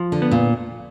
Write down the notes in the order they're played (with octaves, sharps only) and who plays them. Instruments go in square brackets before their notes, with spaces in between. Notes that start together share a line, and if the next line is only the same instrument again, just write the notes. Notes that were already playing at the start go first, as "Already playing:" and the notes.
Already playing: [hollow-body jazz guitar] F3
[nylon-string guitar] D3
[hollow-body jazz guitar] B3
[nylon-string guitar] A#2